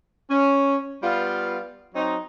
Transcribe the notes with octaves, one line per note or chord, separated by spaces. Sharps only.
C#4
G3 B3 F4
F#3 C4 D#4